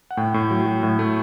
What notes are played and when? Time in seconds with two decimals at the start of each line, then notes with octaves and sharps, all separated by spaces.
0.11 F#5
0.17 A2 G5
0.34 A2
0.51 F#3
0.66 F#3
0.83 A2
0.99 A3